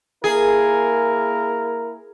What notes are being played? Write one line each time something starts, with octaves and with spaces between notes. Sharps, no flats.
A#3 E4 G#4 A#4